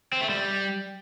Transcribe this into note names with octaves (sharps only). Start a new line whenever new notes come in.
C4
A3
G3